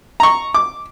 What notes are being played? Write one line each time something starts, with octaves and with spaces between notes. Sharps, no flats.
A#5 C#6
D6